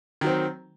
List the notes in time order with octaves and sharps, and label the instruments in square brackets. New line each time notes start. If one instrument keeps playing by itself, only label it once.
[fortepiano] D#3
F#3
C4